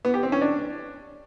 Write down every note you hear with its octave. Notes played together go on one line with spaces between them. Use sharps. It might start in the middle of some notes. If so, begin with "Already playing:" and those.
B3
G4
C4
C#4
D4